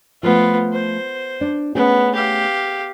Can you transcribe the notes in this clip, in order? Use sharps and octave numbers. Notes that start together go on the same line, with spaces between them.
F3 A3 B3 F4
C5
D4
A3 B3 C#4 G#4
G4 F5